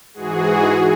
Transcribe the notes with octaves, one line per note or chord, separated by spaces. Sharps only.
G#2 E3 F#4 G#4